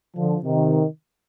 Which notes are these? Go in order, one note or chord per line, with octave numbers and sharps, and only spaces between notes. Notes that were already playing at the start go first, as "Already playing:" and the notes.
D3 F3
C3 D#3